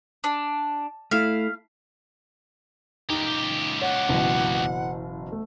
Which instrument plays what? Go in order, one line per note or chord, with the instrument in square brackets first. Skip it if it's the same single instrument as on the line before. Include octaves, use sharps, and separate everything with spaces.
[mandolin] D4
[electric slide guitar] A3 E4 [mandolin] F5
[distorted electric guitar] C#2 G4 [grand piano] D#4
[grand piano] C#5 [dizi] F#5
[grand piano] F#1 B2 E3
A3